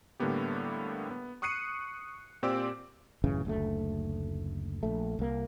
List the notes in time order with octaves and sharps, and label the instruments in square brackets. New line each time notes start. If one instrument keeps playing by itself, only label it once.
[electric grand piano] A2 D3 G3 A#3 B3 G4
B3
C#6 D#6 F#6 C7 C#7 D#7
A#2 C4 G4 D5 D6 E6
[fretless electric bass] A1 F#2 C#3 E3
F#1 D2 A3
A#1 A3
C2 A#3